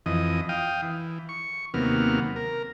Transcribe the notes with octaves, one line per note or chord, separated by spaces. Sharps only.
F2 E3 D#5
F5 G5 D#6
E3
C#6
D#2 C3 F#3 A#3 B3 F6
A#4